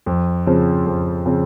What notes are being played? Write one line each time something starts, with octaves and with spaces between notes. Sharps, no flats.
F2
C#3 F3 C4
F2
C#3 F3 C4